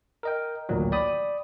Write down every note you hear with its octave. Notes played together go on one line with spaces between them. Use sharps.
A#4 D#5 G5
A1 D2 A#2 D#3 F#3
D5 G5 B5 D#6